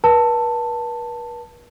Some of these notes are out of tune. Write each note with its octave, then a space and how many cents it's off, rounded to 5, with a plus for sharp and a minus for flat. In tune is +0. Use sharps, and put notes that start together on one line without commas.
B4 -45 A5 +10